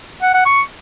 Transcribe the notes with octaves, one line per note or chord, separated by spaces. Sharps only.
F#5
F#5
C#6